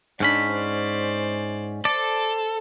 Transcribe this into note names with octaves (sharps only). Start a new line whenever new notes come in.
G#2 C#4 D4 D#5 B5
C5 D5
A4 C5 D5